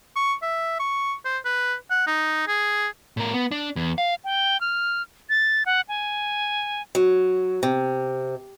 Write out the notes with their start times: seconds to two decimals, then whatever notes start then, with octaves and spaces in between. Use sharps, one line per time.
0.16 C#6
0.42 E5
0.79 C#6
1.25 C5
1.45 B4
1.90 F#5
2.07 D#4
2.47 G#4
3.17 A2 A#4
3.34 B3
3.51 D4
3.76 E2
3.98 F5
4.24 G5
4.61 F6
5.29 A6
5.66 F#5
5.89 G#5
6.95 F#3
7.63 C3